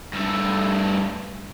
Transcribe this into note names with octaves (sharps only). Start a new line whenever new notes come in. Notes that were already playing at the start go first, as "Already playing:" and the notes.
G2 A3